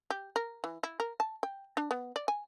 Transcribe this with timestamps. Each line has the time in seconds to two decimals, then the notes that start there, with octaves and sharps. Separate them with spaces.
0.10 G4
0.36 A#4
0.64 E3
0.83 E4
1.00 A#4
1.20 A5
1.43 G5
1.77 D4
1.91 B3
2.16 D5
2.28 G#5